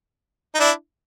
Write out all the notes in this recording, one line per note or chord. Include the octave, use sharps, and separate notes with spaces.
D#4
D4 E4